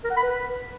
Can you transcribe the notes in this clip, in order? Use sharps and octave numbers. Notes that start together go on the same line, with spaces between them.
A#4
F#5
B5
B4